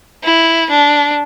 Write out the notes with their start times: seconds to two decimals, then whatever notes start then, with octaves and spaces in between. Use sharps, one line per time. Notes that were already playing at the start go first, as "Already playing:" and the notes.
0.23 E4
0.70 D4